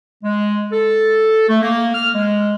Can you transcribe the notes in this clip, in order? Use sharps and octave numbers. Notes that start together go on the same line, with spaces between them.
G#3
A4
A3
A#3
F6
G#3